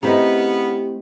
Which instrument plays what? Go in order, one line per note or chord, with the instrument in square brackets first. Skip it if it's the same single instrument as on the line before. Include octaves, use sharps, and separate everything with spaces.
[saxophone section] C#3 B3 [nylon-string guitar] A3 C4 E4 [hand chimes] G4 [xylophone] D#5 A#5